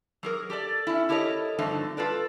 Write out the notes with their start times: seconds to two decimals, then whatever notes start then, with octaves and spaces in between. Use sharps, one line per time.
0.23 F#3 G#4 A#4
0.50 G4 A4 C#5 D5
0.87 C#4 E4
1.09 E4 G4 A4 A#4 C#5 D#5
1.59 G2 D3 F3 A3 C4 D#4
1.97 F4 A4 B4 D5